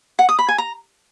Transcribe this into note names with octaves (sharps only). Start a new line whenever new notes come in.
F#5
D#6
B5
G#5
A#5